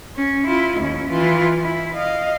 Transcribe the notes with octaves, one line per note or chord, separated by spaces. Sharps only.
C#4
E4 F4
D#2 C#4
E3 F4
E4
D#5 F5